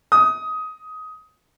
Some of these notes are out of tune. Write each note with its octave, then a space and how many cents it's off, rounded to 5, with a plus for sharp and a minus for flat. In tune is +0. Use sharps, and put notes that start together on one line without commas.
D#6 +15